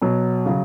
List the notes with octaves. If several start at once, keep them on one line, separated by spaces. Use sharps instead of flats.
B2 F#3
C#3 F#3